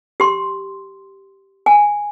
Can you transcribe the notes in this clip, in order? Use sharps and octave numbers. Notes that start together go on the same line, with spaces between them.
G4 C6
G#5